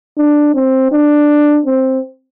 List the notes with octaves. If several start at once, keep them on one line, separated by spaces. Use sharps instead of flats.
D4
C4
D4
C4